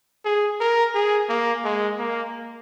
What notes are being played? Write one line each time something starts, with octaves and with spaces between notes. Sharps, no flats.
G#4
A#4
G#4
A#3
G#3
A#3